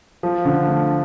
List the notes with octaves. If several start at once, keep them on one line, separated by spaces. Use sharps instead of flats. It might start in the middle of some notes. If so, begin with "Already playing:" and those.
F3
D3
A3